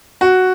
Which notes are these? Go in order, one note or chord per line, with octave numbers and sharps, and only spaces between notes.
F#4